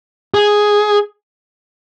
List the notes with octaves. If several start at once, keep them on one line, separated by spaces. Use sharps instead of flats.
G#4